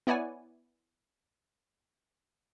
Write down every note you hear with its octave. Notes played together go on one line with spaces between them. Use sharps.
B3 E4 C#5 D5 F#5 G#5